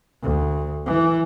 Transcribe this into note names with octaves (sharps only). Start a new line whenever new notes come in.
D2
E3